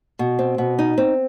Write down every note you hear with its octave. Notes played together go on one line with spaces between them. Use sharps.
B2
C4
B2
D#4
C4